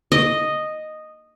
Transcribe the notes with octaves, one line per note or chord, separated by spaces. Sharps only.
D#5